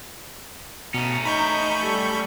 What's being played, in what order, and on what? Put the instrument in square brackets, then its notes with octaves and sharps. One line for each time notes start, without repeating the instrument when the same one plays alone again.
[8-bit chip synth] B2 [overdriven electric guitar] A3 C#4 [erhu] A#5
[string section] D#4 [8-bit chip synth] B5 C#6 G6
[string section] G3 [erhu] A4